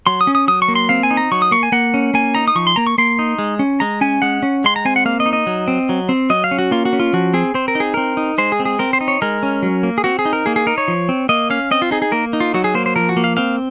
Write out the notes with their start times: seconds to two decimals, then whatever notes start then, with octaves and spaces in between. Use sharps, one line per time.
0.07 F#3 C6
0.21 D#6
0.27 C#4
0.35 D#6
0.48 F#3 D#6
0.62 C#6
0.68 A#3
0.75 C6
0.89 C4 F5
1.03 G#5
1.10 D#4
1.17 A#5
1.31 F#3 C#6
1.42 D#6
1.51 A#3 C#6
1.63 G#5
1.72 A#3 F#5
1.94 C#4
2.14 A#3 G#5
2.35 D#4 A#5
2.48 D#6
2.55 F3 C#6
2.67 C6
2.76 A#3 A#5
2.87 C#6
2.98 A#3 C6
3.19 D#4
3.39 G#3
3.59 C#4
3.80 G#3 A#5
4.01 C#4 G#5
4.22 G#3 F#5
4.43 C#4
4.64 G#3 C6
4.76 A#5
4.85 C4 G#5
4.96 F#5
5.05 A#3 F5
5.20 D#5
5.26 D#4
5.33 D#5
5.47 F#3
5.68 C4
5.89 F#3
6.09 C4
6.30 F#3 D#5
6.44 F5
6.51 C#4
6.59 F#4
6.71 A#3 F4
6.85 F#4
6.93 C#4
7.00 F4
7.13 F3 F#4
7.34 C4 G#4
7.54 C4 C5
7.68 A#4
7.75 D#4 G#4
7.94 C4 A#4
8.17 D#4
8.38 G#3 C5
8.52 G#4
8.60 C4
8.65 G#4
8.79 C4 A#4
8.93 C5
9.01 D#4
9.08 C#5
9.22 G#3 A#4
9.43 C#4
9.63 F#3
9.83 A#3
9.98 G#4
10.04 C4 F#4
10.19 G#4
10.25 D#4
10.33 A#4
10.46 A#3 G#4
10.56 G#4
10.67 D#4 A#4
10.78 C#5
10.88 F3
11.09 C4
11.29 A#3 D#5
11.50 C#4 F5
11.71 C4 D#5
11.82 F4
11.91 D#4 G#4
12.02 G#4
12.12 A#3 A#4
12.33 D#4
12.40 F4
12.54 F#3 F#4
12.64 G#4
12.74 A#3 C5
12.86 C5
12.96 F3 A#4
13.09 F#4
13.17 A#3
13.24 F5
13.37 C4 F5